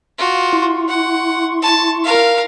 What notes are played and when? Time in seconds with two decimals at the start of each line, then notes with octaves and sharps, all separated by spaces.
0.18 F4 F#4
0.53 E4 C6 C#6
0.88 F#5
1.62 A5
2.04 A#4 F5